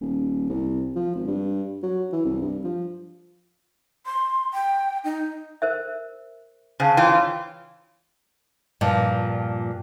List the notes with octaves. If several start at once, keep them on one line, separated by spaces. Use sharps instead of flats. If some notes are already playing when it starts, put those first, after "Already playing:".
D#1
C2
F3
G#1
G2
F#3
E3
C2
G2
F3
C6
G5
D#4
A#4 C5 E5
C#3 C5 F5 A5
E3 F4 C#5 G5
G2 A#2 F3